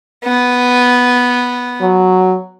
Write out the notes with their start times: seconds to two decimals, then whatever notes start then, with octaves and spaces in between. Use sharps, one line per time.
0.24 B3
1.81 F#3